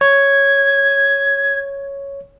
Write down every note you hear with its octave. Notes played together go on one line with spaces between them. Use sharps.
C#5 G#6